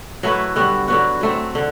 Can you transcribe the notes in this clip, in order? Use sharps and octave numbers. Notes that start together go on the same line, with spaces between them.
F#3 A3 E4 B4
D3 G3 B3 F#4
D3 F#3 B3 F#4
F#3 A3 C4
D3